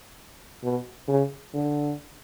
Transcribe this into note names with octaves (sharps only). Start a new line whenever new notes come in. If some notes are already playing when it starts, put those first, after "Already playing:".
B2
C#3
D3